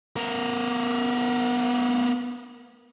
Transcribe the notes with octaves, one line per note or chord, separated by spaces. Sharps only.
B3 A#4